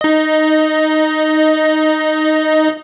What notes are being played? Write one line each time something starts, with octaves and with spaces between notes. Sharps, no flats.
D#4 D#5